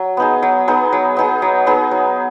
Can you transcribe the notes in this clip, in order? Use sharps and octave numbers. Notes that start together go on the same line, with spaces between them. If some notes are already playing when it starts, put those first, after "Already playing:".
Already playing: F#3
B3 D#4 G#4
F#3
B3 D#4 G#4
F#3
B3 D#4 G#4
F#3
B3 D#4 G#4
F#3